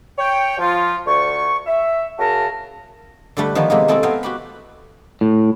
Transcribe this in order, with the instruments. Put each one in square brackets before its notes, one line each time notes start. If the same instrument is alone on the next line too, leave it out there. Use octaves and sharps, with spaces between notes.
[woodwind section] C#5 G5
F3 F4
D2 C#6
E5
C#3 F#4 A#4 A5
[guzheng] D3 G3 A3 B4
D#3 F3 B3 D#4 C5 C#5
C3 G#3 A#3 B3
A3 C4 E4 G#4 A4
B3 C4 F5 G5 G#5 A#5
F#4 G4 B5
[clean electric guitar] A2